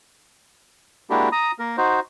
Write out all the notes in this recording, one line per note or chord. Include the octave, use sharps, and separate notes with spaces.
G#3 A#3 D4 E4 F#4 G4
A#5 D#6
A#3 A#4
D#4 F#4 C5